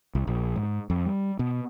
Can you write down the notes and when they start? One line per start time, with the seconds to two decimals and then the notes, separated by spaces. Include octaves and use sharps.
0.15 C2
0.27 A#1
0.56 G#2
0.90 F2
1.06 G3
1.39 B2